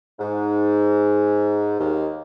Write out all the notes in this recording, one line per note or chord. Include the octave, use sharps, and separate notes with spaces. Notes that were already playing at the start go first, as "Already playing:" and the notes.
G#2
D#2